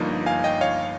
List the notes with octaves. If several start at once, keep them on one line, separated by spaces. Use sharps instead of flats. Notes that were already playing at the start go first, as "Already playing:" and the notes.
Already playing: G1 G2 F3 A#3 D#4
F5 G#5
D#5 G5
C#5 F5